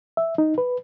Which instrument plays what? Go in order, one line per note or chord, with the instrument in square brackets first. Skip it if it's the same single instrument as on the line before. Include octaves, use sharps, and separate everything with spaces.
[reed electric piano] E5
D#4
B4